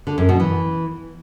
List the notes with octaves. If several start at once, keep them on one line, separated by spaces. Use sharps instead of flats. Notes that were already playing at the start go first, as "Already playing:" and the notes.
D3
F#2
B2
E3